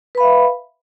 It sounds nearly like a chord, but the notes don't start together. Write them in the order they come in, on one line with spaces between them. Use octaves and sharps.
B4 B5 F5 E5